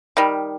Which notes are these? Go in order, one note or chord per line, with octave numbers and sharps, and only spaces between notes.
D#3 G3